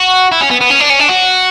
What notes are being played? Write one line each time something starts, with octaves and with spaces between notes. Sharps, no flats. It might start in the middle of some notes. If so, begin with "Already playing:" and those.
Already playing: F#4
E4
C#4
B3
B3
C#4
D4
C#4
D4
F#4